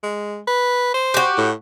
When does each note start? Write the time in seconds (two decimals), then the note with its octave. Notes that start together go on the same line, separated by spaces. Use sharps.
0.03 G#3
0.47 B4
0.94 C5
1.14 F#4 G4
1.38 A2